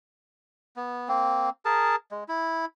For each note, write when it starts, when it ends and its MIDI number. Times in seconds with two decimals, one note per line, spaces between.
0.76 1.08 59
1.08 1.50 58
1.08 1.50 60
1.65 1.96 68
1.65 1.96 70
1.65 1.96 81
2.11 2.24 56
2.28 2.65 64